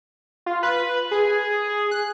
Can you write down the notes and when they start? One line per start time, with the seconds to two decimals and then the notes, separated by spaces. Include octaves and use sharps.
0.46 F4
0.63 B4
1.11 G#4
1.91 F#6